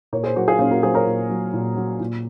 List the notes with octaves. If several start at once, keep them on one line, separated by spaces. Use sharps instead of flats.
A#2 A#4 C#5
G#4 C5
F#3 F#4 A#4
F4 G#4
A#2 C#4 F4
F#4 A#4
F#3 G#4 C5
A#4 C#5
A#2
F#3
A#2
F#3
A#2